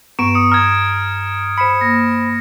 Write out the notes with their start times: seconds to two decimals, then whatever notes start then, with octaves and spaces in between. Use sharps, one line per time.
0.19 G2 B3 A#5 C#6 D7 E7
0.34 D#6 C#7
0.52 A#5 F6 G#6
1.58 C5 B5 C#7 E7
1.81 A#3 A#6